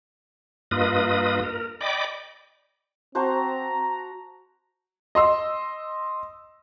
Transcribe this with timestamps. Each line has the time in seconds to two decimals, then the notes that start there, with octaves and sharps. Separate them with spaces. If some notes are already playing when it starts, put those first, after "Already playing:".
0.71 G2 A#3 F4 B4 D#5 D#6
1.43 A#4
1.81 D5 D#5 G5 B5 D6
3.15 C4 F#4 C5 A5 A#5
5.15 D#5 C6 E6